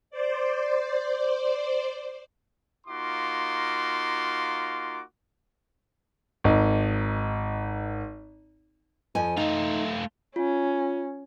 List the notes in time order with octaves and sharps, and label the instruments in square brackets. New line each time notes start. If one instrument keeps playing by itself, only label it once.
[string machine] C5 D5
[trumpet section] A#3 D#4 F4 F#4 C6 D6
[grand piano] G#1 D#4
[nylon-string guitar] F2 F3 G#5
[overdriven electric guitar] A3 F4 [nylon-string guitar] D#4
[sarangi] C#4 [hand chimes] F4